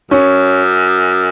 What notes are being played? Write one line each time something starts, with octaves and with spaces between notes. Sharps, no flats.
F#2 C#4